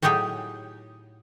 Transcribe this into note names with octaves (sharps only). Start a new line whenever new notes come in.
A2 F#3 D#4 G4 G#4 G5